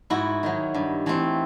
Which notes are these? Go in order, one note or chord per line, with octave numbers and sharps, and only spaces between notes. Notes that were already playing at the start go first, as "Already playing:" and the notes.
G#2 E4 F#4
D#3 F#3
G2
E3 A3 C4